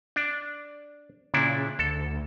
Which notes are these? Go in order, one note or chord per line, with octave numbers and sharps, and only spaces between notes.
D4
A#2 C#3 D4 E4
D2 A4